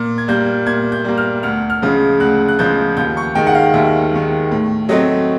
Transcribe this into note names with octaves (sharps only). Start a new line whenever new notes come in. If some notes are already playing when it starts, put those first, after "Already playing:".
Already playing: A#2
G#6
G3 A#3 G6
A#2 G#6
G6
G3 A#3
F6
D2 F6
F6
C#3 F3 G#3
D2 F#6
F#6
C#3 F3 G#3 G6
D#2 G6
C#6
D#3 G#3 G5
F#5
F5
D#2 E5
D#3 G#3
A2
F#3 A3 C4 D#5